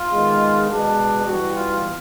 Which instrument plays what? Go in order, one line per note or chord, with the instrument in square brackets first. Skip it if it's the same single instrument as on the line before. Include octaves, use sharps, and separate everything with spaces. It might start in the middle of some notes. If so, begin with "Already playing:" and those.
Already playing: [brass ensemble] F4
D#3 G#3 B3
B2 G#3 B3 D4
E3 G3 B3 F#4
F4